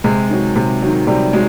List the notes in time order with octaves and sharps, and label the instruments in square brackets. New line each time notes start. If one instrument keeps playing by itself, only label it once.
[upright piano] C3 G#3
D#3 F#3
C3
D#3 F#3
C3 G3
F#3 G#3